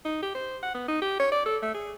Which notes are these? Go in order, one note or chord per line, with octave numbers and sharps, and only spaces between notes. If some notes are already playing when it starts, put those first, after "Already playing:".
D#4
G4
C5
F#5
B3
D#4
G4
C#5
D5
A4
A3
G#4